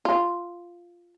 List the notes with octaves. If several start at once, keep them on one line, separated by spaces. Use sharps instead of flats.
F4